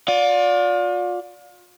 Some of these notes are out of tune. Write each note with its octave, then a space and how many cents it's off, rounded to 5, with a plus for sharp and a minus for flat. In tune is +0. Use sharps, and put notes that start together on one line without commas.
F4 +35 D5 -15